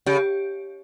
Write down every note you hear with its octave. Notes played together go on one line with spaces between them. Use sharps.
C#3 G4